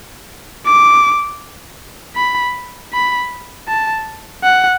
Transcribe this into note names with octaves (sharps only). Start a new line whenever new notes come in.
D6
B5
B5
A5
F#5